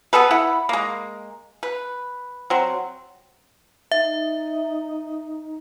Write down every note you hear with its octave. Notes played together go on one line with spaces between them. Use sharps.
B3 G#4 A4 B4
E4 F#5 B5
G#3 A#3
B4
F#3 C4
D#4 E5